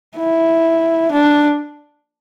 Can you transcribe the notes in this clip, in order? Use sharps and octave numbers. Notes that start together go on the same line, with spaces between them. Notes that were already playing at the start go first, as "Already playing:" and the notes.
E4
D4